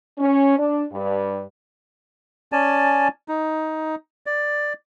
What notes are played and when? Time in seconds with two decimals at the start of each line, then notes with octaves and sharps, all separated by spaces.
0.18 C#4
0.58 D4
0.91 G2
2.52 C#4 D5 G#5 A5
3.28 D#4
4.26 D5